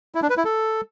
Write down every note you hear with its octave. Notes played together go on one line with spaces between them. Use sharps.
E4
D4
B4
E4
A4